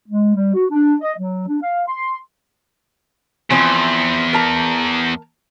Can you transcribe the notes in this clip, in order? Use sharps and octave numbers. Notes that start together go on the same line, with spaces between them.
G#3
G3
F#4
D4
D#5
F#3
D4
F5
C6
E2 E3 F3 C4
A#4 A5 A#5